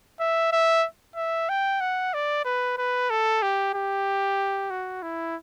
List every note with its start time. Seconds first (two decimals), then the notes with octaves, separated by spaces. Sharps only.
0.20 E5
0.52 E5
1.16 E5
1.49 G5
1.81 F#5
2.14 D5
2.45 B4
2.78 B4
3.10 A4
3.42 G4
3.74 G4
4.70 F#4
5.02 E4